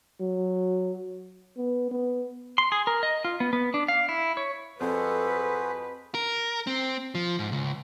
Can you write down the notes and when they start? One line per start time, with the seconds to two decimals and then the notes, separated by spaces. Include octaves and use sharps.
0.20 F#3
1.57 B3
1.91 B3
2.58 C6
2.72 G#4
2.87 A#4
3.03 D#5
3.25 F4
3.40 B3
3.53 B3
3.74 D4
3.88 F5
4.09 E4
4.37 C#5
4.80 F2 F#4 G#4 A4 B4 C5
6.15 A#4
6.67 C4
7.15 F3
7.39 G#2
7.52 C#2